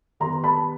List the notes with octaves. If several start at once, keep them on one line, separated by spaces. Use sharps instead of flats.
D#3 G3 B3 A#5 C6
A5 B5